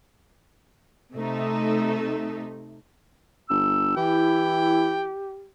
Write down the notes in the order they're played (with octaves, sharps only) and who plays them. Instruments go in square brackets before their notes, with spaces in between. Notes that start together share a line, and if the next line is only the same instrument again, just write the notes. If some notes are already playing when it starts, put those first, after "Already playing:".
[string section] C3 A3 D#4
[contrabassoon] G1 [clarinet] E6
[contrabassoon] E3 [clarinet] E4 [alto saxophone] G4 [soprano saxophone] G5